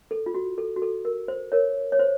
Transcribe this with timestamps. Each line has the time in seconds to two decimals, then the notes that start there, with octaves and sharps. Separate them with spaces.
0.11 A4
0.26 F4
0.34 F#4
0.58 A4
0.76 F#4
0.82 A4
1.05 A#4
1.28 C5
1.52 A#4 C#5
1.92 C#5
1.99 C5